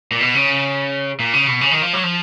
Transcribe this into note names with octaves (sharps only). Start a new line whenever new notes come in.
A#2
B2
C#3
A#2
C#3
B2
C#3
D#3
F3
F#3
F3